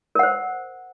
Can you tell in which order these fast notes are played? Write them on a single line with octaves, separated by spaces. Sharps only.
A#4 F#5 C5